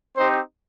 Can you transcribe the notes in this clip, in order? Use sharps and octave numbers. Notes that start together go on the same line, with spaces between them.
C4 D#4 G4 C5